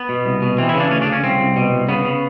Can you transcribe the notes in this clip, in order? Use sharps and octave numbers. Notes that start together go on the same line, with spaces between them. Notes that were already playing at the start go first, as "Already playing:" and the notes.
Already playing: B3
B2
C2
B2
E3 C4
E4
C#3
D4
D2 C#4
D4
C#3
C#4
C2 C4
C2
B2
C2
C#3 B3
C#3